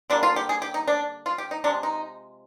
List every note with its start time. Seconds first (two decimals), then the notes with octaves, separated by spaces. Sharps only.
0.10 D3 G3 A#3 D4
0.23 F4
0.36 G4
0.49 G#4
0.62 G4
0.74 D#4
0.87 D4
1.26 F4
1.38 G4
1.51 D#4
1.64 C3 F3 G#3 D4
1.83 D#4